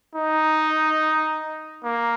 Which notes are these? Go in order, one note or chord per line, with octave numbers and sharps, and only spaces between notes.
D#4
A#3